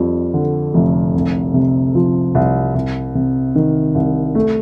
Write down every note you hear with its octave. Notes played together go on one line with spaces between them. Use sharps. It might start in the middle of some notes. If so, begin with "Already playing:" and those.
Already playing: F2 G3
D3
F1
C2
C3
F3
C2
C2
C3
D#3
C2
A3